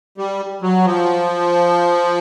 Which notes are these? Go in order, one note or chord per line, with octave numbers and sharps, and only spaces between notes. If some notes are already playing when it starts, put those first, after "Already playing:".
G3
F#3
F3